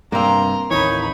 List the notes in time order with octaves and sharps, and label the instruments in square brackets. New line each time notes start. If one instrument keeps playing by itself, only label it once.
[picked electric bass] G2 C3 [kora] A#3 C4 [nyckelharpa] A#5 C6
[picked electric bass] A1 D#2 E3 [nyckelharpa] D#4 B5 [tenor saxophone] C#5